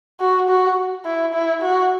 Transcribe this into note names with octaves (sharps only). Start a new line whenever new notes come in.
F#4
F#4
E4
E4
F#4